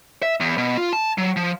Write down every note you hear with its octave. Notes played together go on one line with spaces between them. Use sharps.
E5
E2
B2
F4
A5
F#3
F3